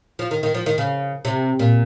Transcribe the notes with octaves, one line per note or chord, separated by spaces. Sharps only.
F3
D#3
D#3
F3
D#3
C#3
C3
A#2